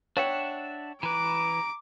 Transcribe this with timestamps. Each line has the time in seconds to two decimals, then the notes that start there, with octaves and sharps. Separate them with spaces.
0.17 D4 C#5 E5 F#5 G5
1.03 E3 B4 A#5 D6 D7